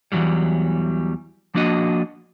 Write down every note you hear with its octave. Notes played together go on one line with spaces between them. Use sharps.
E2 C3 E3 F#3 G3
F3 A#3 D4 F#4 D#5